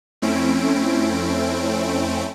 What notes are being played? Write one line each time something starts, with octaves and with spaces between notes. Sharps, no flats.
F2 A3 C4 C#4 E4 D7